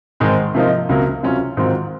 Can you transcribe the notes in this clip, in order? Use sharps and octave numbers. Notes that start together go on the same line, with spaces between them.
G#2 D#3 G#3 C4
C3 F3 A#3 D#4
C#2 C3 F#3 A#3
C3 F#3 C#4 F4
G#2 D#3 F#3 C4 F4